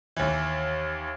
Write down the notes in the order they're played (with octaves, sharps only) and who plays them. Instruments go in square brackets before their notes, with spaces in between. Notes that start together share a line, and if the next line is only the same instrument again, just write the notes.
[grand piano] D#2 E3